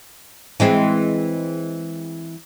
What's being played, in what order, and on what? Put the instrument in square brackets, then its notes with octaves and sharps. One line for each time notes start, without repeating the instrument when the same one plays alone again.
[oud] E3 G#3 C4